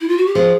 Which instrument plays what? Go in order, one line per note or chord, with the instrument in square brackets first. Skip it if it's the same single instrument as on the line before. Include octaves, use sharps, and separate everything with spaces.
[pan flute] E4
F4
F#4
G4
[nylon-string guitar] F3 [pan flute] G#4